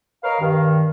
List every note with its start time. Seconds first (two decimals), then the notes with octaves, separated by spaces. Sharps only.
0.24 A#4 B4 C#5 D#5 F5
0.41 G2 D#3